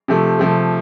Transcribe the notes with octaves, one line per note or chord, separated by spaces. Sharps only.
C3 F3 A3
C3 F3 A3